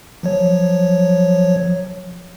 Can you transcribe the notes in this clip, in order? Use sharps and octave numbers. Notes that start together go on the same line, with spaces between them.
F3 F#3 C#5